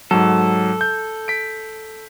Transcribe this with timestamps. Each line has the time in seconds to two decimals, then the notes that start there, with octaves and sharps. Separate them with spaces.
0.11 G#2 F#3 A4
0.81 G6
1.28 B6 D7